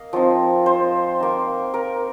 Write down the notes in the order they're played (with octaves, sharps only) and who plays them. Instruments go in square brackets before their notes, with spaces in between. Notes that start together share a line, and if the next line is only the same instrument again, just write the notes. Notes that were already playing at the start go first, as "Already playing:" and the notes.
Already playing: [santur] A#3 D#5 F5
F3 C4 D#4
C5
A#3 D#4
A#4